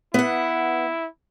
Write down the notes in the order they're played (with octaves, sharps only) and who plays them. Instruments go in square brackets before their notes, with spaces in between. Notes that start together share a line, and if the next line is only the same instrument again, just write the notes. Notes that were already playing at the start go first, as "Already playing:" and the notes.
[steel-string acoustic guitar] B3 F#5 [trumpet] E4